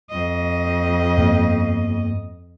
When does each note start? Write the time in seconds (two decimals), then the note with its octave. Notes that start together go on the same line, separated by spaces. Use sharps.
0.10 F2 D#5
1.17 G2 A#3 B3